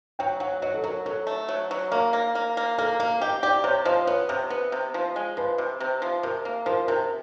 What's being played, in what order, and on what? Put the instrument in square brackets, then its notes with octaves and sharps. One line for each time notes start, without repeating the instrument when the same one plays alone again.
[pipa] F#3 [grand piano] G5
[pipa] F#3 [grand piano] F#5
[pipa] F#3 [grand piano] D#5
[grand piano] A4
[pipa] F#3 [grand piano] A#4
[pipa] F#3 [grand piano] A4
[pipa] A3
F#3
F#3
[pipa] A#3 [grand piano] A#4
[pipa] A#3
A#3
A#3
[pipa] A#3 [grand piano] A4
[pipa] A#3 [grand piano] A#4
[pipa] G4 [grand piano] D#5
[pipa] G4 [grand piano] D5
[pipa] C3 [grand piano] C#5
[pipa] F3 [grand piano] D#5
[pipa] B3 [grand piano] C#5
[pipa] C3 [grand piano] C5
[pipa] B3
C3
F3
G#3
[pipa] F3 [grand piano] B4
[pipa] C3
C3
F3
[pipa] C3 [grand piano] A#4
[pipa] A#3
[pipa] F3 [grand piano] A#4
[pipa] C3 [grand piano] A#4